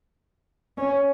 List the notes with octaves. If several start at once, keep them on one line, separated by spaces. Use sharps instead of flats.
C#4